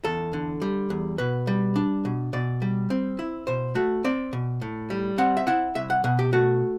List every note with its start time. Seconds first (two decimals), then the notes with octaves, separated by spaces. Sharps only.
0.04 E2 A4
0.33 D3
0.62 G3
0.90 E2
1.18 B2 B4
1.47 G3
1.76 D4
2.05 B2
2.33 B2 D5
2.62 G3
2.90 C4
3.19 E4
3.47 B2 C5
3.75 A3 F#4
4.04 C4 D5
4.33 B2
4.61 A2
4.90 G3
5.18 C4 F#5
5.37 E5
5.47 E4 F#5
5.75 C2 E5
5.90 F#5
6.04 B2 F#5
6.19 G4
6.33 A3 F#4